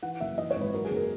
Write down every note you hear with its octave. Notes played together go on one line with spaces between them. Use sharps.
E3 F#5
F#1 E5
E3 D#5
C#5
G#1
B4
F#3 A#4
G#4
F#1
A#4